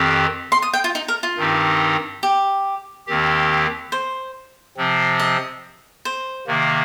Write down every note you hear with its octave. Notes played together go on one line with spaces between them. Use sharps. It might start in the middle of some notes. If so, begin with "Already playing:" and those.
Already playing: F2 D#3 C4 G4
C6
D#6
G5
F4
D#4
A#4
F4
G2 D#3 C4 D#4 G4
G4
D#2 D#3 C4 G4
C5
C3 F3 C4
D#5
C5
C3 D#3 A#3